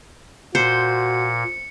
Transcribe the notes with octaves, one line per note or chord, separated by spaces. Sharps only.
A#2 F#4 C5 C#7